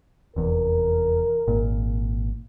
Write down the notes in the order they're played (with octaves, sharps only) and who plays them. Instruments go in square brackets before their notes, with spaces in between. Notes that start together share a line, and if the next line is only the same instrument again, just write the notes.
[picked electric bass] F1 E2 [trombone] A#4
[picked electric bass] G#1 A#2